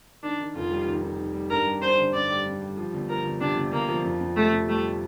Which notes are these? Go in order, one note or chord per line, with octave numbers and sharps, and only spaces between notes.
D#3 D4
D#3
F1 F4
G3
D#3
D#3
D#3
G3
G2 A#4
G3
G2 C5
D3
G2 D5
G3
G2
G3
F3
G1
F3 A#4
G1
C3 D4
G1
G1 A#3
F3
F2
F2
C3 A3
C3
G3 A3